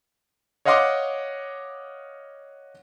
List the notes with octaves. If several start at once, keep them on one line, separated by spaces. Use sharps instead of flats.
C#5 D#5 F5 F#5 C6 D6